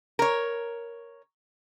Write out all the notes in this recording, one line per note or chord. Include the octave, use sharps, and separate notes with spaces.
A#4 C#5